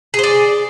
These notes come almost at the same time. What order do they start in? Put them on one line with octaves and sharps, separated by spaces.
G#4 C5 D5